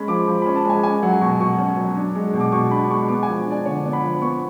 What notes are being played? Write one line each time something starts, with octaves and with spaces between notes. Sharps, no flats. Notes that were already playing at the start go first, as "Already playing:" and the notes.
Already playing: G#3 C#4 B5
F3 D6
F3
C#4 B5
A5
G#3 G#5
C#4 G#5
F#3 F#5
B2 C#6
B2 C#6
C#4
F#3
D4
G#3
B2
D6
B2 C#6
D4 B5
G#3 C#6
B3 D6
F3 G#5
D4 D5
D3 C#5
B3
B5
F3
B3 C#6